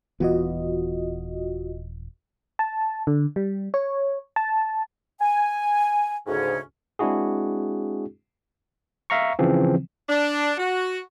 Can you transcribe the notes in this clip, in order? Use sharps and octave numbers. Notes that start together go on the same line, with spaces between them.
D#1 E3 B3 F4 F#4 D#5
A5
D3
G3
C#5
A5
G#5
D2 G#2 C#3 C#4
G#3 C4 D4 E4 F#4 G#4
E5 F5 A#5 C#6
C#3 E3 F3 C4
D4
F#4